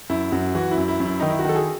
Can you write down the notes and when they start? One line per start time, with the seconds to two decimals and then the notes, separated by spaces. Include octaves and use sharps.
0.10 F#2 E4
0.32 F#2 F#4
0.55 E3 F#4
0.71 E4
0.78 F#2
0.88 E4
1.00 F#2
1.05 E4
1.20 D#3 D#4
1.30 E4
1.39 F#4
1.45 D#3 A4
1.56 G#4